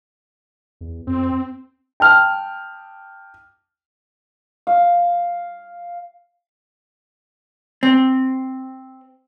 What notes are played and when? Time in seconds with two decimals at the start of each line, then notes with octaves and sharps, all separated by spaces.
0.81 E2
1.07 F2 C4
2.00 G5 A5 F6
4.67 F5
7.83 C4